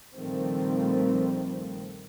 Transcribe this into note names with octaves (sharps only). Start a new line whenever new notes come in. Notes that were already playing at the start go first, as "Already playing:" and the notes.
A#1 D#3 F3 G3 A3 C4